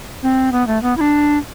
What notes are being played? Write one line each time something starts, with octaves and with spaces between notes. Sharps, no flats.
C4
B3
A3
B3
E4
D4